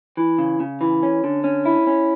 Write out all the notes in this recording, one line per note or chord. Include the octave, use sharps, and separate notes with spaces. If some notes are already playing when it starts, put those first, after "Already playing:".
E3
C#3
C#3
E3
C#4
D3
C#4
E4
C#4